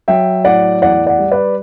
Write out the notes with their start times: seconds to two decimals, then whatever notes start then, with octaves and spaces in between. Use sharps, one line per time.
0.08 F#3 E5 G5
0.45 A2 D5 F#5
0.82 E2 D5 F#5
1.07 D5 F#5
1.19 G3
1.31 B4 D5